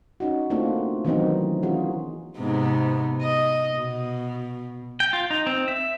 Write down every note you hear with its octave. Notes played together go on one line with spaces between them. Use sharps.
C#4 D#4 F#4
A3 A#3 C4 D4 D#4 F4
D#3 E3 F#3 B3 C4 D#4
E3 C#4 F4 F#4 G#4
G#2 C3 B3
D#5
B2
G5
F4
D#4
C4
E5